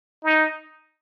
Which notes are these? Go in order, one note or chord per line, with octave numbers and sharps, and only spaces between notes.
D#4